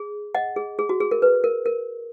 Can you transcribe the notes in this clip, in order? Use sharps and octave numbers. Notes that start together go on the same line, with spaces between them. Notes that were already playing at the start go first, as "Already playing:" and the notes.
Already playing: G#4
D#5 F#5
G#4
G#4
F#4
G#4
A#4
B4
A#4
A#4